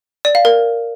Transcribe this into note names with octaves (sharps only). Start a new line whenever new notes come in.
D5
F5
A#4